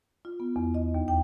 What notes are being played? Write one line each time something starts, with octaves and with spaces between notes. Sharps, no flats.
F4
B3
E2
D#5
D#2
G5